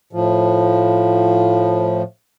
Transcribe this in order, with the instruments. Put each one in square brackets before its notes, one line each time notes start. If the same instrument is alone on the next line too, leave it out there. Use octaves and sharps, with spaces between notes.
[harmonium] A2 F3